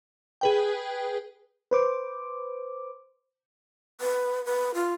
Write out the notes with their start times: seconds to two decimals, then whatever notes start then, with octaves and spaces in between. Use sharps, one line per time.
0.41 G#4 B4 G5
1.71 B4 C5 D6
4.01 B4
4.46 B4
4.74 F4